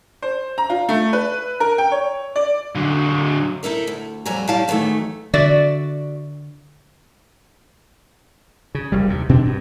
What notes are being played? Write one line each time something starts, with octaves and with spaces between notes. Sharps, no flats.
C5
A#5
F4
A3
B4
A#4
G5
C#5
D5
D3 F#3
D#4 E4 A4 A#4
D2
F2 F#3 G3 A4 G#5 A#5
A2 F#3 G3 E4 F5 A5
G#2 D#3 E3 F#3 A3
D3 F#4 D5 E5
C#3
F#1 G3
D#2 C3
B2 C4 D4
G2